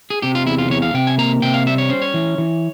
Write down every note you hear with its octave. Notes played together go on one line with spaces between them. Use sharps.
G#4
C3 G4
F4
E2 E4
F4
E2 C#5
F5
C3 G5
G#5
A#3 A#5
C3 G5
F5
G3 E5
C#5
C#4 C5
C#5
E3
E3